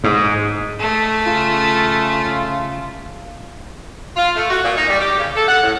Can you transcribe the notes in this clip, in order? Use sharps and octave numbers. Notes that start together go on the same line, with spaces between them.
G#2
A3
C#3 F4
F4
A3
F#4
A#2
D#4
G3
G4
C#3
A4
F#5
A2